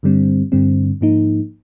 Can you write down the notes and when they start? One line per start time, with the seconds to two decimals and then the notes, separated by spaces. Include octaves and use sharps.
0.03 G2 D3 G3 C4
0.52 G2 D3 G3 C4
1.01 G#2 F3 A#3 D#4